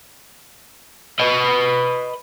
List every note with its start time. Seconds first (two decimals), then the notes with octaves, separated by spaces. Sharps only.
1.20 B4 D#5